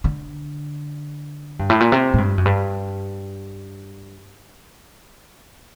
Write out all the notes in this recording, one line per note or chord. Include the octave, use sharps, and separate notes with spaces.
D3
G2
A2
A#2
C3
A2
G2
F#2
G2